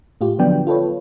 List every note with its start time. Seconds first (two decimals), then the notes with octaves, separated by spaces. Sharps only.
0.21 A2 F4 G4
0.39 D3 F3 F#3 B3 D4 G5
0.67 F4 A4 B4 C#5